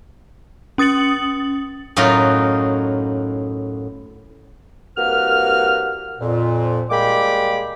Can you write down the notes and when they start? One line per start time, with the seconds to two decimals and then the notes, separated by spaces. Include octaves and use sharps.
0.78 C#4 D#6 A6 C#7 F#7
1.96 F#2 A2 F#3 D#4 F4
4.97 C2 A#3 F#4 B4 F6
6.21 F2 A#2
6.90 G3 G#3 A#3 G5 B5 D6